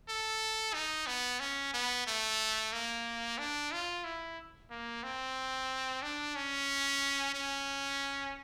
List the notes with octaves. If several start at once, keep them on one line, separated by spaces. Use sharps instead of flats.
A4
D#4
B3
C#4
B3
A3
A#3
D4
F4
E4
A#3
C4
D4
C#4
C#4